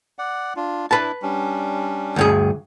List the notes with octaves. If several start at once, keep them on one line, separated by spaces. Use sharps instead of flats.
D5 F#5
D4 F4
D4 E4 B4 A5
G3 C#4 D4
D2 G2 G#4